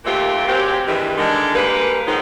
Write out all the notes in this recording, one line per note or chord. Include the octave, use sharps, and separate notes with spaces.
D#2 A#2 A3 C4 F4 G4
F#3 G#3 C4 G4
E2 G2 D#3 E3
D3 D#3 G#3
G3 G#3 A#3 B4
G#2 D#3 F3 F#3 G#3 D#4